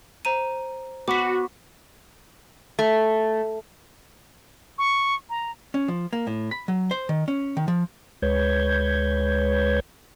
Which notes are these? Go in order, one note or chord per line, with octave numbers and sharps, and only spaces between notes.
C5 A#5 D#7
B3 F#4 D6 B6
A3
C#6
A#5
C#4
F3
A#3
A2
B5
F#3
C5
D#3
C#4
D#3
F3
D2 G#3 B4 C#5 G6 G#6